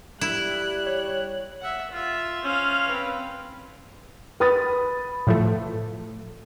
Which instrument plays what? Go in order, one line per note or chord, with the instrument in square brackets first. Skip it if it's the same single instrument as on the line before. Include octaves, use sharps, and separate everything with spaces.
[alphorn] G3 [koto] E4 [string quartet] F#6
[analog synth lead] C#5
[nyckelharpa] E5 F#5
F4 E5
[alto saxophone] C#4 [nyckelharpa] C5 F5
[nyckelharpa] C4 B4
[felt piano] B4 B5 D#6 A6
[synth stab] A2 F3 A3